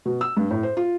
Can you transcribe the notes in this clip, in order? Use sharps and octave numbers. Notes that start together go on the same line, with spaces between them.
B2
E6
G2
A2
C5
F4